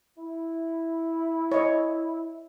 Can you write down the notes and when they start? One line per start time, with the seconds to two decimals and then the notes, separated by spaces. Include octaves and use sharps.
0.18 E4
1.52 C#5 D#5